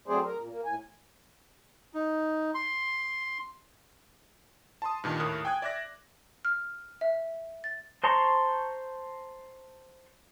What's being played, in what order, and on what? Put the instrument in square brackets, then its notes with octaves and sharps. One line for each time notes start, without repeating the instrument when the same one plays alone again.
[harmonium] F#3 A3 C4 G#4 C5 D5
A#4
A#2
A#3
A2 G#5
[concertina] D#4
C6
[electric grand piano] A5 C6 D#6
G2 A#2 D#3
D#2 A2 A#4 D#6 F#6
G5 G#5 D#6 F#6 G#6
D5 E5 D6 F#6 A#6
[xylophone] F6
E5
A6
[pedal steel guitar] C5 A5 A#5 C6 C#6